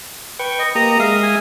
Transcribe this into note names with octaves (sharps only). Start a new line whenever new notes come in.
B4 G5 C#6
D#5
A#3 G4 D#5 A#5 D#6
G#3 E5 F5 D#6
G#5